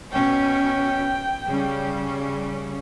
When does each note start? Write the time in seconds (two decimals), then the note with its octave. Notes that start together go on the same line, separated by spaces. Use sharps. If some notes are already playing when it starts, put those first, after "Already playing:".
0.12 B2 C#4 G5
1.47 C#3 G3 C#4